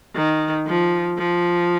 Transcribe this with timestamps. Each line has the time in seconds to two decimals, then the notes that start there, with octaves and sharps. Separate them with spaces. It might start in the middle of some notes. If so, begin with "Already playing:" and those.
0.15 D#3
0.67 F3
1.18 F3